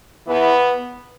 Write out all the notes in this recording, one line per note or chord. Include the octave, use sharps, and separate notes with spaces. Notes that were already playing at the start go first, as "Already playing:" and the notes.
E2 E3 B3